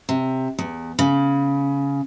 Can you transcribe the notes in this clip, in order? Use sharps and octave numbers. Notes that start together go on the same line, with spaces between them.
C3
E2
C#3